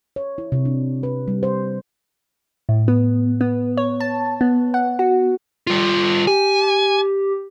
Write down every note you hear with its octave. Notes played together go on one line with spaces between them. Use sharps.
C#5
E4
C3
D4
B4
G3
C5
A2
B3
B3
C#5
A5
B3
F#5
F#4
G3 F4
G4 G#5